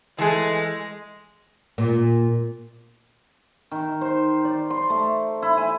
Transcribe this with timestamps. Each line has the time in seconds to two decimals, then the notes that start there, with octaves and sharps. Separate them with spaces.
0.18 E3 G#3 A3 G#4
1.78 A#2
3.71 D#3
4.01 C5
4.45 D5
4.70 C6
4.90 A3
5.42 E4
5.57 G#5